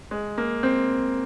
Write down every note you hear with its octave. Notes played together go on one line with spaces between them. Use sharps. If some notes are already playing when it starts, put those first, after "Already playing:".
G#3
A#3
C4